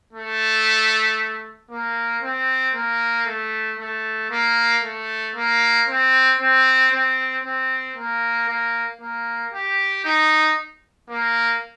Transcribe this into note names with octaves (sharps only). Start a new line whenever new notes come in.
A3
A#3
C4
A#3
A3
A3
A#3
A3
A#3
C4
C4
C4
C4
A#3
A#3
A#3
G4
D#4
A#3